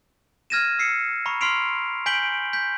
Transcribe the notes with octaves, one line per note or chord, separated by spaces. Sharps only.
F6 G#6 A#6 D#7 E7
E6 C7 C#7
A#5 B5 C#6
C6 F6 B6 C7 D7 F7
G#5 G6 B6 D7 F#7 G7
G6 B6